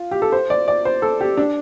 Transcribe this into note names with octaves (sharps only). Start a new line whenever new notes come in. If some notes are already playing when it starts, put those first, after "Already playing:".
Already playing: F4
G4
A4
C5
D5
D5
C5
A4
G4
D4